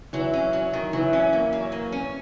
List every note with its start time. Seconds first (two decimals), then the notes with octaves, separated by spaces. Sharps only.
0.13 E3 F#3
0.33 C#4
0.53 F#3
0.73 D#3
0.93 E3 F#3
1.13 C#4
1.33 A#3
1.53 F#3
1.72 A#3
1.92 C#4